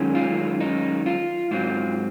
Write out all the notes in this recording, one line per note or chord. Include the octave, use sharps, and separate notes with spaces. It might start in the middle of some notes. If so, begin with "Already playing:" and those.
Already playing: F#2 D#3 G#3 C#4
F4
D#4
F4
G#2 F#3 C4 F4